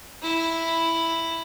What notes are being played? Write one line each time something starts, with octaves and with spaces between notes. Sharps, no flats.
E4